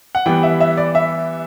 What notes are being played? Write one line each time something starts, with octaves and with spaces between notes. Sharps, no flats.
F#5
E3 G3 B3 G5
E5
E5
D5
E5